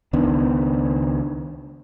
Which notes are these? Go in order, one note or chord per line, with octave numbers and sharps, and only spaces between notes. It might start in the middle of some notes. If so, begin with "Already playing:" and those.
C#2 D#3 B3 D4